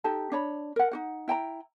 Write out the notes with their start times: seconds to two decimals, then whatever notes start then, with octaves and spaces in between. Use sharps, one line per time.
0.04 D#4 G4 A4 A5
0.32 D4 C#5 B5
0.76 A#4 F#5
0.91 D#4 F#4 F#5
1.28 E4 G5 A5 A#5